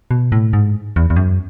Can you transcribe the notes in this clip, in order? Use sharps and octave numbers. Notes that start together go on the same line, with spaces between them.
B2
A2
G#2
E2
E2
F#2